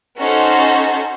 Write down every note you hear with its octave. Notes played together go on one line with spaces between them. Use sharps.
C#4 D#4 F#4 A4 C5